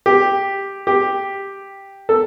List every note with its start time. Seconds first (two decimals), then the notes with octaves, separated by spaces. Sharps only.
0.06 G4
0.87 G4
2.09 A4